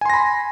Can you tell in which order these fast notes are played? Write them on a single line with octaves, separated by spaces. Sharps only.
G#5 C6 A#6 B5